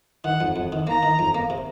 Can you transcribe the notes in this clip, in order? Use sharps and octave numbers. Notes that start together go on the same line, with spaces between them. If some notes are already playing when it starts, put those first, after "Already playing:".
D#3 F#5
F2
F2
D#3
A#3 A#5
D#3
F2
A#3
C3